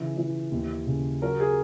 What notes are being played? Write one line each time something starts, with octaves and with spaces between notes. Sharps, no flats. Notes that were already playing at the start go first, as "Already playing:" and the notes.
Already playing: C#3 E3
E3
D#2
C#3
F#3 A#4
G#4